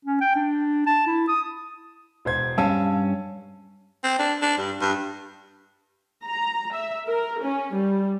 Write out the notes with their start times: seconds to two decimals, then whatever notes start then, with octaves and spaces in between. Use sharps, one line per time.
0.05 C#4
0.21 G5
0.36 D4
0.86 A5
1.07 E4
1.28 D#6
2.25 E1 C5 G#6
2.58 G2 C#4 F5 A5 E6
4.04 C4
4.19 D4
4.42 D4
4.58 G2
4.81 G2
6.25 A#5
6.73 E5
7.07 A#4
7.42 C#4
7.75 G3